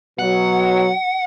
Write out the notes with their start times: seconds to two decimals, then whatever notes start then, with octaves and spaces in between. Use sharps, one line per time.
0.19 B2 F#3 F#5